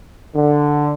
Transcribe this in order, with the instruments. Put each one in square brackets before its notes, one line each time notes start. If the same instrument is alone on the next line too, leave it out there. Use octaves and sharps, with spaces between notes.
[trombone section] D3